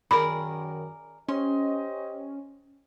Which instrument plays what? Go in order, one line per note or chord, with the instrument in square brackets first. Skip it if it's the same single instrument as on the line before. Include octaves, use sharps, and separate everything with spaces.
[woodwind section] F#2 D#3 [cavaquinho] G#4 A#4 D5 [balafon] B5
[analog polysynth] C#4 [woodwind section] G4 C5 D#5 [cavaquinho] C6